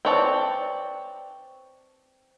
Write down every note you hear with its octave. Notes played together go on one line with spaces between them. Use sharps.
C4 B4 C#5 D5 A5